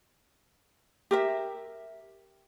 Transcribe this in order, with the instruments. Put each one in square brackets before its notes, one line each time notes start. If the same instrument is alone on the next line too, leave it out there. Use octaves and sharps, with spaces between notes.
[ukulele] G4 A#4 E5